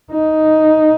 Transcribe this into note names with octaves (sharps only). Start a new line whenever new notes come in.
D#4